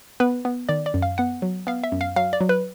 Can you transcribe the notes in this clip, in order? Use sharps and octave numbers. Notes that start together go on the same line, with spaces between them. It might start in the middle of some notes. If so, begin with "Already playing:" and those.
B3 B4
B3
D#3 D5
D5
F#2
F5
B3 F#5
F#3
B3 F5
E5
F#2
F5
F#3 F5
D5
F#3
B4